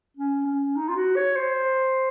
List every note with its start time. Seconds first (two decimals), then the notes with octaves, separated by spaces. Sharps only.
0.17 C#4
0.46 C#4
0.76 D#4
0.89 F4
0.96 F#4
1.16 C#5
1.36 C5